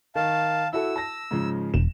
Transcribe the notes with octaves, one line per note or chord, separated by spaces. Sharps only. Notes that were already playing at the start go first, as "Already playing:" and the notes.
D#3 F5 A5
E4 F#4 A4 E6
A5 A#6
G#2 C#3 F3
E1 E7